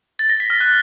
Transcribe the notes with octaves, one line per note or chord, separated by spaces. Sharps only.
A6
A#6
B6
F6
F#6